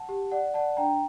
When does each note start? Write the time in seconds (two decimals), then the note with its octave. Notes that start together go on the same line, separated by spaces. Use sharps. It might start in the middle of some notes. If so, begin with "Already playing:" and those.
Already playing: F#5 A5
0.09 G4
0.32 D5 F#5
0.54 D5 F#5 A5
0.77 D4 G5 A#5